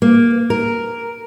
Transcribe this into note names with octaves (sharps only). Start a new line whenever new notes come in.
A#3
A#4